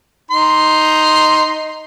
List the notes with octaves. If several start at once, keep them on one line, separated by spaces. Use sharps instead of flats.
D#4 C6